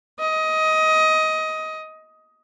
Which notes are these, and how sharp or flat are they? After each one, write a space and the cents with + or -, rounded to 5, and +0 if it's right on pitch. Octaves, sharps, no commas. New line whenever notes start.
D#5 +15